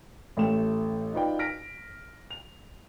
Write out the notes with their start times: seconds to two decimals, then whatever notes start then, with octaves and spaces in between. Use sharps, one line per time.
0.37 A1 A3 G5 E7
1.13 D#4 F4 B4 D5 G5
1.39 F6 A#6 B6 D7
2.31 F7